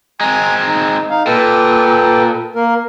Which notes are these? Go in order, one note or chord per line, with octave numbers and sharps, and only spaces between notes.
G#3 C4 G#5 A#5
D#4
D#4 F5
A#2 A4 B4 G5
A#3 A#4